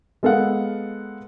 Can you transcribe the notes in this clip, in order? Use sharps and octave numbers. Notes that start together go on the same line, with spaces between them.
G#3 B3 A4 A#4 F5 F#5